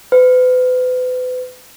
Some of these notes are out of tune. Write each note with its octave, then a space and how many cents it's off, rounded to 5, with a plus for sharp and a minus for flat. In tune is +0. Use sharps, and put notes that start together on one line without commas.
B4 +40